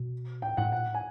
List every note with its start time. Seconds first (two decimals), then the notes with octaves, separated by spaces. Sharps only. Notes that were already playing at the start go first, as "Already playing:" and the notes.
Already playing: B2
0.42 A2 G5
0.57 A2 F#5
0.72 A#2 F#5
0.87 A2
0.94 G#5